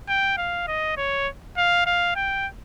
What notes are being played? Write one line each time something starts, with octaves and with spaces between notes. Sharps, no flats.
G5
F5
D#5
C#5
F5
F5
G5